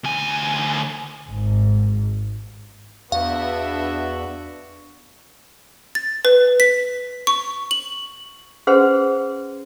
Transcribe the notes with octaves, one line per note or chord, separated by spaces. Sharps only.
D2 G#5
G#1 G#2
E2 B3 D4 F#4 E5 F5
A6
B4
B6
C#6
F#7
C#4 G#4 B4 C5 F#5 C6